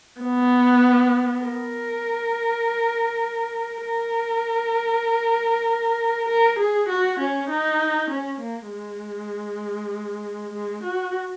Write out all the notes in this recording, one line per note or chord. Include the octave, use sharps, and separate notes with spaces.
B3
A#4
A#4
A#4
G#4
F#4
C#4
D#4
C#4
A#3
G#3
G#3
F#4